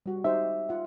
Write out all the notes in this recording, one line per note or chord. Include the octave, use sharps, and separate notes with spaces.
G3 F#4
D#4 G4 C5 E5
F4 F#5